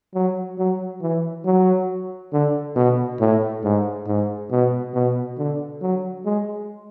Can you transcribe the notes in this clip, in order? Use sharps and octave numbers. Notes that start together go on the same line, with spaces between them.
F#3
F#3
E3
F#3
D3
B2
A2
G#2
G#2
B2
B2
D3
F#3
G#3